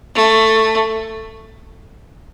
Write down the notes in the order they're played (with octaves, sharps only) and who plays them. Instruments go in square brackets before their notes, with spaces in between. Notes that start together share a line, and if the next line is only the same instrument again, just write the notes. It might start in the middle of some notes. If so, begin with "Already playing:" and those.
[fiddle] A3